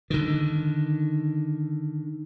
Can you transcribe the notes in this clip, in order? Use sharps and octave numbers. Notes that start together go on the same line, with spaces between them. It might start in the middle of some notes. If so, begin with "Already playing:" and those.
D3 D#3